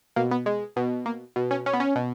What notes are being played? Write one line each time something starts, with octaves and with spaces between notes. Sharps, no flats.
B2 A#3
B3
G#3
B2
A#3
B2
C#4
C#4
B3
C#4
B2